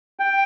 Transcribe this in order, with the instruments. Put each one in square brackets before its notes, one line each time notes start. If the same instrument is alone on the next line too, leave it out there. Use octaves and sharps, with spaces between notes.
[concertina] G5